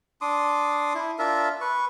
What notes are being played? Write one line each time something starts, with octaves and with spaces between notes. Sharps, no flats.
D4 C6 D6 D#6
E4
D4 F4 A#4 E5
B4 C#6